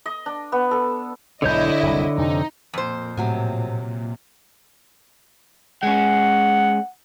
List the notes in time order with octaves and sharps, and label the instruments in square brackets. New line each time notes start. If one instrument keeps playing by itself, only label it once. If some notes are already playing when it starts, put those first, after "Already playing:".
[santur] D#5
D4
B3
A4
[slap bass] B1 G#2 [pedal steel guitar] D3 C#5 G6 [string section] E4 D#5
[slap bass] F#1 C2
[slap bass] F2 C3 F3 [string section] D#4
[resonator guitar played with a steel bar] F2 C5 [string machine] A#2
[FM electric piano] A2 [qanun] C3 F#3 G#5
[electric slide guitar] G#3 C#4 [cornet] F#5